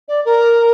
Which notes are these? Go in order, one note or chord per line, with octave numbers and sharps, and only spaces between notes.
D5
A#4